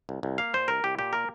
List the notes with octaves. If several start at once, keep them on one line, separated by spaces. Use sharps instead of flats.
C2
C2
A#3 F5
A#2 C5
C2 A#4
C2 G4
A#2 G4
A#3 A#4